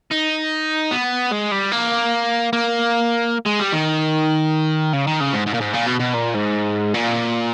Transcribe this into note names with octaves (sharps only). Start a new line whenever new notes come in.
D#4
B3
G#3
G3
A#3
A#3
G#3
G3
D#3
C#3
D#3
C#3
G#2
G#2
A#2
G#2
A#2
B2
B2
A#2
G#2
A#2